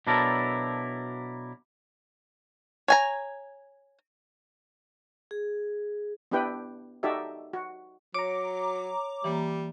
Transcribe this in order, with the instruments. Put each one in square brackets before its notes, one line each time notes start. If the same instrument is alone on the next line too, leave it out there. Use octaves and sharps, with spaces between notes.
[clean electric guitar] B2 F#3 D4 E4 A4 A#4
[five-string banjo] C#5 G#5 A#5
[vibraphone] G#4
[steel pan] B3 D4 E4 G4 B4 G5
D#4 F#4 G4 A4 D5 E5
F#4
[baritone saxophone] F#3 [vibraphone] C#5 [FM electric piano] A#5 D6
[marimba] E3 A#3 [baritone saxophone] G3